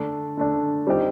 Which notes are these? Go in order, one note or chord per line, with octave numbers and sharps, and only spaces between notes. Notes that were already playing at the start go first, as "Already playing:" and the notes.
Already playing: D3 A3 D4
D3 A3 D4
G3 C4 D#4 G4